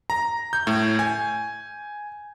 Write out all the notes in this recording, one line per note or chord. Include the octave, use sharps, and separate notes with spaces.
A#5
G6
A2
G#5